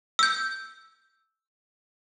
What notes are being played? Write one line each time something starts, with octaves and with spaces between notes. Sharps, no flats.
E6 G6